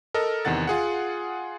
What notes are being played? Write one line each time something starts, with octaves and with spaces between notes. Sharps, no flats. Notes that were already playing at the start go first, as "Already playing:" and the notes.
A4 A#4 D#5
E2 C3 D#3 F#5 A6
F4 G#4 F#5